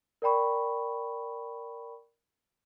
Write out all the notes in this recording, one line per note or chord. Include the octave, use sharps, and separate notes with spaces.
A#4 D5 G5 B5 C#6